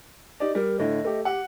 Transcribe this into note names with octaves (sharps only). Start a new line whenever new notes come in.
D#4 G4 D5
G3 A#4
A2 D3 D#5
A3 G4
G4 F#5